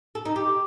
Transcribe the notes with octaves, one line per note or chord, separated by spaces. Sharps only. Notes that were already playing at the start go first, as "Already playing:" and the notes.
A4
D#4
G4